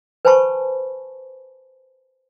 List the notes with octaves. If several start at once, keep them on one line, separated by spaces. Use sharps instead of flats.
B4 C5 G#5 A5 B5 C#6